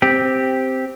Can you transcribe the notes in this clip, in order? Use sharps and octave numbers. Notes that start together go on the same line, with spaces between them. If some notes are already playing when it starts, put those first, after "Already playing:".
C4 G4